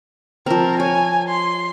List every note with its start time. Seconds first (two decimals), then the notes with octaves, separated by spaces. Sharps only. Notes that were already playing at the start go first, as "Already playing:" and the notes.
0.46 F3 C4 A#4
0.80 C#5 G#5
1.29 C6